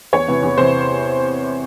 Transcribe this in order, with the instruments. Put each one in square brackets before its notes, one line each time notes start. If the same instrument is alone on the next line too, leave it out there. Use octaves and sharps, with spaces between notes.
[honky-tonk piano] E2 C#5
C3 E3
E2
C3 E3 C5